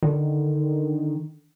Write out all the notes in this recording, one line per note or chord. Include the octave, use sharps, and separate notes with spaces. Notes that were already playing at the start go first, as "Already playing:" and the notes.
D3 D#3